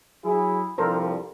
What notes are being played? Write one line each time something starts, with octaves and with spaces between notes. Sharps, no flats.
F#3 E4 G#4
C2 G2 F3 A4 A#4 C5